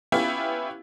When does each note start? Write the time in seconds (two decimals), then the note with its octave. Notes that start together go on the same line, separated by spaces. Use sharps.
0.12 B3 C#4 E4 F4 G4